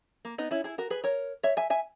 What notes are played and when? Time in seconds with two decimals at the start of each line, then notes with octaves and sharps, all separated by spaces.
0.25 A#3
0.38 B3 D#4
0.51 C#4 E4
0.64 E4 G#4
0.78 F#4 A#4
0.90 G#4 B4
1.04 A#4 C#5
1.43 C#5 E5
1.57 E5 G#5
1.70 E5 G#5